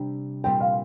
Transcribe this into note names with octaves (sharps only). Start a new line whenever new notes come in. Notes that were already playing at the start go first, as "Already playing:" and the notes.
Already playing: C3 G3 D4 G4
A#2 G3 C4 G4 G5
F5